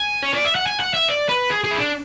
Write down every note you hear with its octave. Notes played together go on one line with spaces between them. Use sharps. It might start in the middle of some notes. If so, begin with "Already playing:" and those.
Already playing: G#5
C#5
D5
E5
F#5
G#5
F#5
E5
D5
B4
G#4
G#4
E4
D4